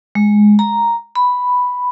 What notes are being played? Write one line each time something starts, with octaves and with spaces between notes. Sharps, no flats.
G#3
A#5
B5